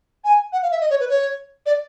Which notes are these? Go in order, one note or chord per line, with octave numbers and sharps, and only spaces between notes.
G#5
F#5
F5
E5
D#5
C#5
B4
C#5
D5